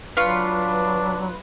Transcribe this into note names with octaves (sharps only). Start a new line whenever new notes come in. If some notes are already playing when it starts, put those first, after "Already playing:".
F#3 D4 F4 B4 C#6